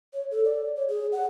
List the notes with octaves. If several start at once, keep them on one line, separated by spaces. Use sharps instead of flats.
C#5
A4
D5
C#5
G#4
F#5